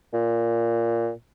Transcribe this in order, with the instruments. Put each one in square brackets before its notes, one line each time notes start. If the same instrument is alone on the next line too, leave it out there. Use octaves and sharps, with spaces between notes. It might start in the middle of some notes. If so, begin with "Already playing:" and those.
[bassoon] A#2